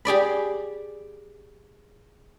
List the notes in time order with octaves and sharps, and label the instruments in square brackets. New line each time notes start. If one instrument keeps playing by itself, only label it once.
[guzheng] G4 G#4 D5 B5